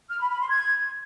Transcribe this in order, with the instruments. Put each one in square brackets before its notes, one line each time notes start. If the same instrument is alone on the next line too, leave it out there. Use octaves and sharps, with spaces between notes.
[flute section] F6
B5
B5
C6
G#6